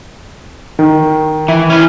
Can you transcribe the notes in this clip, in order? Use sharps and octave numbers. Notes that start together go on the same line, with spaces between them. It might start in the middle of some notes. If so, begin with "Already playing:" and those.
D#3
E3 E4
C#4 B4